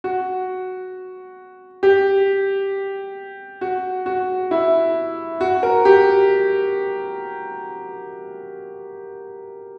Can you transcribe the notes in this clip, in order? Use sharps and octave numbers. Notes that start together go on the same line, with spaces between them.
F#4
G4
F#4
F#4
E4
F#4
A#4
G4